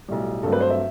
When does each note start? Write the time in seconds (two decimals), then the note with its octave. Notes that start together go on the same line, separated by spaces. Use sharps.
0.08 B1 A2 G3
0.43 G2 F#3 A3 C4 A4
0.52 B4
0.61 C5
0.70 E5